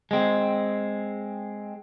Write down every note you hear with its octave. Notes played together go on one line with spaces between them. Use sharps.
G#3 C4